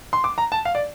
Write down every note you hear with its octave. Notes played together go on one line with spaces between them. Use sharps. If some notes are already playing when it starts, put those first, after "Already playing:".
C6
D6
A#5
A5
F5
D5